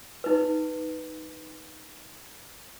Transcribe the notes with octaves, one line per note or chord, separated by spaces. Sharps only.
D#4 B4